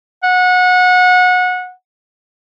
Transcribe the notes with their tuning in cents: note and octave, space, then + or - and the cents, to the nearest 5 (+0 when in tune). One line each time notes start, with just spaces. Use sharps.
F#5 -25